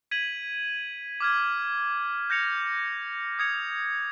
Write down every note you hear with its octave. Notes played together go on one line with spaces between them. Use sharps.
G#6 B6 D#7 F#7
D6 F6 G#6
G6 A#6 C#7 F7
D#6 G#6 C#7 F7